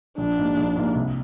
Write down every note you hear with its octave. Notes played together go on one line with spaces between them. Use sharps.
A#1 D4
G#2 G3 A#3
A#1
G#2 G3 A#3
C2